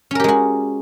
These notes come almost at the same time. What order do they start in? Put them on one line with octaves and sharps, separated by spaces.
C#4 A#4 G4 G#3 F#4